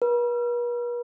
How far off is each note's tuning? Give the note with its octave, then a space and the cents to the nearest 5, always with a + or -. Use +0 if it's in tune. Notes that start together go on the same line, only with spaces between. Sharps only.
B4 -45